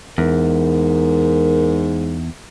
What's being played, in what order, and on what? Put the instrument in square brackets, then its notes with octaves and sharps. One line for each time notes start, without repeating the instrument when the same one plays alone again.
[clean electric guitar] E2 [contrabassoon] G#2 [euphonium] A#4